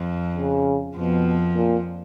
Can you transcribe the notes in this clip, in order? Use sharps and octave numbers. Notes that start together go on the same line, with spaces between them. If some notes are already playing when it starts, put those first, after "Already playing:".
Already playing: F2 F3
C#3
F2 B2 F3
A#2